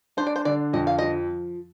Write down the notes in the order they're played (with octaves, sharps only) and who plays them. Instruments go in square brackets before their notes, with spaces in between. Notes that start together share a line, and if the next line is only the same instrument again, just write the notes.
[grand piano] D4 [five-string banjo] C5
[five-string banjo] D5
C5
[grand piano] D3 [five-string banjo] D5
[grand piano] F2 [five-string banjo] D#5
[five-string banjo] F5
[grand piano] F3 [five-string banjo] D#5